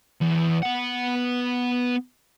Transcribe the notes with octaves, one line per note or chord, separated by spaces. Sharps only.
E2
B3 F#5